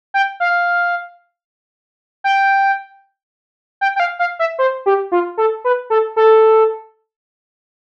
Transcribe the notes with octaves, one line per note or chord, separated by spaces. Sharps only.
G5
F5
G5
G5
G5
F5
F5
E5
C5
G4
F4
A4
B4
A4
A4